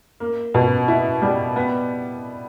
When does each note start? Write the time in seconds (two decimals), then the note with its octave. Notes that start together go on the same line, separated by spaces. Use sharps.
0.20 A#3
0.54 B2
0.88 E4
1.22 G3
1.56 B3